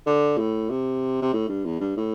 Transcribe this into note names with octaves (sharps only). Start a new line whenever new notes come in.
D3
A2
C3
C3
A2
G2
E2
G2
A2